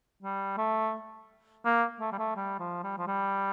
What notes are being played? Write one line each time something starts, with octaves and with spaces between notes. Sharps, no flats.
G3
A3
A#3
A3
G3
A3
G3
F3
G3
F3
G3